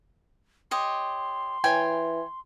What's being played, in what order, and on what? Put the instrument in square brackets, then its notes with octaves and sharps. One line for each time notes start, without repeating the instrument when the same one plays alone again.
[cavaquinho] G4 C#5 D#5 [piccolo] C6
[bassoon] E3 [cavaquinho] C#5 G5 G#5